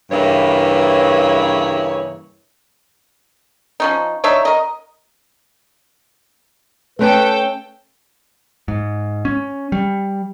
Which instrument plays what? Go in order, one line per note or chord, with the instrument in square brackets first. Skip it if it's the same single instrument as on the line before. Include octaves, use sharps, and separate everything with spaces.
[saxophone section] G2 C#3 E3 A#3 E4 C#5
[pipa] F3 C#4 D#4
D4 D#4 C#5 E5
A#4 D#5
[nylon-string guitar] A3 C#4 [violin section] A4 G5 [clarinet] B4
[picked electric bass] G#2
C#4
G3